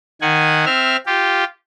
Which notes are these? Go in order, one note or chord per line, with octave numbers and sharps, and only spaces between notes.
D#3 F#5 G#5
C4 E5 F6
F4 G4